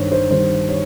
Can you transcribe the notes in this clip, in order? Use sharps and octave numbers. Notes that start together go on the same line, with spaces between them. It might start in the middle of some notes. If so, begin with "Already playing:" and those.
Already playing: G2 D#3 G3 C5 C#5
C5
G2 D#3 G3 C5
C#5